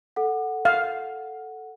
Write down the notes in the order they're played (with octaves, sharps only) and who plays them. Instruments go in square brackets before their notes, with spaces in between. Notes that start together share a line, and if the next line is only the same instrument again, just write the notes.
[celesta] A4 F#5
[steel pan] F5